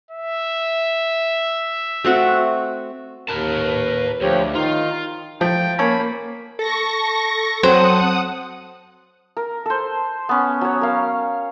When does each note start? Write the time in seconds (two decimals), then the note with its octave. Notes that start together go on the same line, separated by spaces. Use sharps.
0.10 E5
2.05 A3 C4 F#4
3.29 D#2 A#4 B4 A5
4.21 D2 F3 G4 C#5
4.55 D#3 D#4 F4
5.41 F3 A3 G5
5.79 A#3 C#4 A4 C#5 B5
6.59 A4 C#6 A#6
7.63 F#3 C4 C5 F#5 D#6
9.37 A#4
9.66 A4 C5
10.29 B3 C#4
10.61 F#3 C#5
10.81 A#4 F5